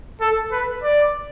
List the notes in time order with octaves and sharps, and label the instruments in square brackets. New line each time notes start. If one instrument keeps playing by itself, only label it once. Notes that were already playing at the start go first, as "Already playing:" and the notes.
[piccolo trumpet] A4
B4
D5